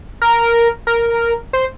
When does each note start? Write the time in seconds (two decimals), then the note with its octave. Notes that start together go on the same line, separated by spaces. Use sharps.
0.22 A#4
0.87 A#4
1.53 C5